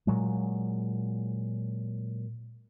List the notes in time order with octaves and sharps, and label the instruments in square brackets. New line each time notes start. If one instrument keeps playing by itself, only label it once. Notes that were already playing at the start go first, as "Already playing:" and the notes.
[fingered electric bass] A#2 F#3 G#3